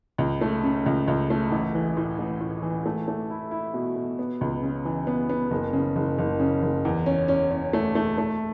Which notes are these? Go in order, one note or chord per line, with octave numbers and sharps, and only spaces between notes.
C#2
A3
C#3
C#2
C#2
A3
A1
E3
A2
A1
A2
E3
A3
A3
E4
E4
B2
B2
B3
C#2
C#3
E3
B3
B3
F#1
C#3
F#1
F#1
C#3
F#1
E2
C#4
C#4
C#4
A3
A3
A3